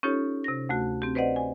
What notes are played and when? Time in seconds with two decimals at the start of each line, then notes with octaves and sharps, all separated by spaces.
0.03 C#4 D#4 F4 G4 A4 C#5
0.44 C3 A#6
0.69 D2 A3 F#4
1.02 C4 G4
1.15 B4 C5 D5 D#5 F#5
1.36 G#5